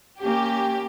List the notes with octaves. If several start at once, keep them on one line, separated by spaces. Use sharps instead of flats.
A#3 C#4 G4